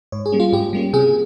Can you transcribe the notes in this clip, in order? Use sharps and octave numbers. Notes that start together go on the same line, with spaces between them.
G#2 C#5
G#4
G3 A#3 C#4
F4
G#2 G4
G3 A#3 C#4
C3 G#4